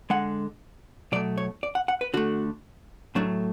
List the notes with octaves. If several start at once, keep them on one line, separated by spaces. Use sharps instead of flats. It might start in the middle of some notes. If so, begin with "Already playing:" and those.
D3 G#3 F#5
B2 F#3 A3 D5
C#5
D5
F#5
F#5
B4
D3 A3 F#4
A2 F#3 A3 D4